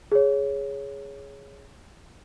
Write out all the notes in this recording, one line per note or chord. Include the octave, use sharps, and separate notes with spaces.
G#4 C#5